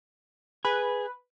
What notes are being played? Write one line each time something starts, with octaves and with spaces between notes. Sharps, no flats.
G#4 B4